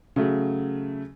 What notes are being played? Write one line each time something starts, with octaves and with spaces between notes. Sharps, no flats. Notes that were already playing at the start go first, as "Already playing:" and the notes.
C#3 F#3 A3